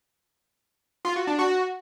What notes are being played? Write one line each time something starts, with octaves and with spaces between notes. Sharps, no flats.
F4
F#4
D4
F#4